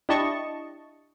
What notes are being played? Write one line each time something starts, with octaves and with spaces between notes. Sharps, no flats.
D4 E4 G4 D#5 A5 C#6